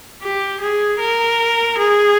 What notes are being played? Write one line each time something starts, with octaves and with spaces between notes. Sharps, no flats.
G4
G#4
A#4
G#4